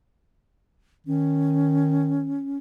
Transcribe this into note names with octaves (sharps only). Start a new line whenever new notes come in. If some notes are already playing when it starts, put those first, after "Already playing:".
D#3 C#4